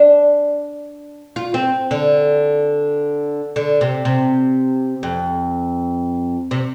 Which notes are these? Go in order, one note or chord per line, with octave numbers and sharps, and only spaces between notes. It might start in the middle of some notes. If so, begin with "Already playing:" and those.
Already playing: D4
F4
C4
D3
D3
C3
C3
F2
C3